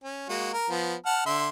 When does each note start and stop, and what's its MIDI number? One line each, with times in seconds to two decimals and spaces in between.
0.03 0.26 61
0.29 0.52 56
0.29 0.52 58
0.29 0.52 66
0.53 0.68 70
0.70 0.95 53
0.70 0.95 59
1.06 1.25 78
1.06 1.25 81
1.06 1.25 89
1.26 1.49 50
1.26 1.49 76
1.26 1.49 84